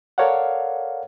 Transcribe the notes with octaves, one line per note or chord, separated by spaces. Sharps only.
A4 A#4 C#5 D5 F5 F#5